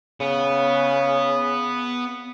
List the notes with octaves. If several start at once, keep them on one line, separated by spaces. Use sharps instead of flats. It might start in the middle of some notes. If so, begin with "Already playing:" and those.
C#3 B3